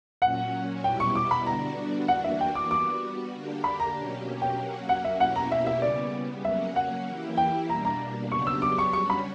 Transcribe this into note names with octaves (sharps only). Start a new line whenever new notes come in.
A#2 F#3 C#4 F#4 F#5
B2 G3 B3 E4 G4 G5
C#6
D6
B5
D3 G3 B3 D4 F#4 A#5
E3 A#3 D4 F#4 F#5
E5
G5
D6
G3 B3 F#4 D6
D3 A#3 D4 G4
B5
A#5
B2 F#3 A#3 C#4 G4
G5
F#3 A#3 C#4 F#4
F#5
E5
B2 A#3 C#4 E4 G4 F#5
A#5
E5
E5
C#3 G3 B3 D5
F#3 A#3 C#4 F#4 E5
F#5
E3 A#3 E4 G4
G5
B2 G3 A#3 D4 A#5
A#5
C#3 F#3 B3 D4 G4 C#6
E6
D6
C#6
G3 C#4 F#4 C#6
B5